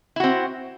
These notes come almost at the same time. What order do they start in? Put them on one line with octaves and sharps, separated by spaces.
E4 F#4 C4